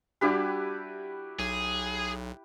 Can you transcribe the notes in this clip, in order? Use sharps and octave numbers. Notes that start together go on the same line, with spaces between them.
G3 D4 E4 F#4 G4 B4
B1 G#4